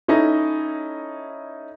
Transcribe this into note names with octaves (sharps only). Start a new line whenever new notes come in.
C#4 D#4 E4 A4 D#5